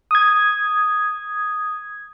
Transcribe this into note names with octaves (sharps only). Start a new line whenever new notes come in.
D#6 G#6